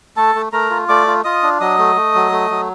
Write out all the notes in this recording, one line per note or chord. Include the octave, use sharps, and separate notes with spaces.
A3 A4 A5
A3
A3 A#4 A#5
F4
A3 D5 D6
F4
F4 D#5 D#6
D4
F#3 D#5 D#6
A3
A3
F#3
A3
F#3